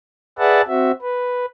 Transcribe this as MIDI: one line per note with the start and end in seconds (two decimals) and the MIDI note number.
0.39 0.61 68
0.39 0.61 71
0.39 0.61 74
0.39 0.61 76
0.39 0.61 78
0.39 0.61 81
0.68 0.92 60
0.68 0.92 66
0.68 0.92 76
1.02 1.45 71